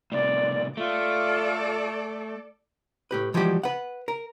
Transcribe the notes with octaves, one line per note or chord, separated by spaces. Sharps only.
A2 C3 D5
A3 F4 A4 D5
A2 G4 B4
E3 F3 G3 G#3 F#4 G4
B4 F#5
A#4